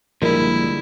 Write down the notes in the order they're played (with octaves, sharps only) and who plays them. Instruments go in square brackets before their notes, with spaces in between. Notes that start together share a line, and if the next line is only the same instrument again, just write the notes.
[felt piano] A#1 A#4 [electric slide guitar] D3 G3 G#3 [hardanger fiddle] E4